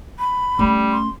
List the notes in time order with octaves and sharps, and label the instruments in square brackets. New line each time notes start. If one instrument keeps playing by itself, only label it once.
[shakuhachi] B5
[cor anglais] G3 [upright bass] A3 C#4
[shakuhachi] C6